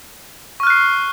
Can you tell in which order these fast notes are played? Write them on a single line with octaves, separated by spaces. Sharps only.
C#6 F6 F#6 C7